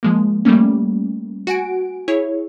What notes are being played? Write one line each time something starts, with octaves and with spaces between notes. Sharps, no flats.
F3 G#3 A#3
G3 A3 A#3 C#4
F#4 F#5 G#5 D7
E4 G#4 C#5